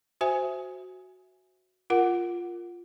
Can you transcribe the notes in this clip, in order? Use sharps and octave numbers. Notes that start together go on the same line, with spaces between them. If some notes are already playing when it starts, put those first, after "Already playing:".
F#4 C5 E5 G#5
F4 A#4 F#5